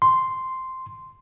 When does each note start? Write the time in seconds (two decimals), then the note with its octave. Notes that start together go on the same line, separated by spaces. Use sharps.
0.02 C6